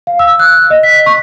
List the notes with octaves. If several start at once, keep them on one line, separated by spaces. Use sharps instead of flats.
F5
E6
F#6
D#5
B6
C#6